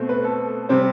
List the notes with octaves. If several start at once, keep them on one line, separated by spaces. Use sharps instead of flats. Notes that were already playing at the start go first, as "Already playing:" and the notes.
Already playing: B2 A3 C4
B4
A4
C3 G3 C4 C5